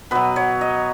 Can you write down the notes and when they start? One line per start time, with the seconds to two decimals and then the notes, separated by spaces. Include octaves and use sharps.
0.11 B2 F#3 B4
0.36 C#5
0.61 D#5